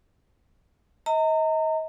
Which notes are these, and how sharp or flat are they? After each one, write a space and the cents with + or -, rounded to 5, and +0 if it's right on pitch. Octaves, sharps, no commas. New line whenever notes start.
D#5 +35 A#5 -35